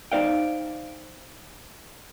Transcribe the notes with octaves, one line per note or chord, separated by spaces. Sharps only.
D#4 C5 D5 F5 G5